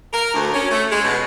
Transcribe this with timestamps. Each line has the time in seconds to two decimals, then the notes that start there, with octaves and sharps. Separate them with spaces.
0.13 A#4
0.34 D2
0.54 C#4
0.71 A3
0.91 G#3
1.04 B2